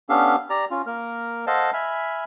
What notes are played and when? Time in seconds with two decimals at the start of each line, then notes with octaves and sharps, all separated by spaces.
0.09 B3 C#4 D4 G4 A4 F5
0.50 G4 D5 A#5
0.71 C#4 F4
0.86 A#3 A#4 F6
1.47 A4 C5 D#5 F5 F#5 A5
1.73 E5 G#5 B5 F6